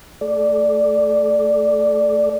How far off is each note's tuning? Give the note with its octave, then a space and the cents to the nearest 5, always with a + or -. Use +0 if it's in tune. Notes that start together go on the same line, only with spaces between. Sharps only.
A3 +15 A4 -35 D5 +0